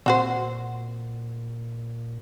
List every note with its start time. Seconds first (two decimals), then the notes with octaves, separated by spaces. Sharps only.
0.06 A#2 C4 F#4 C5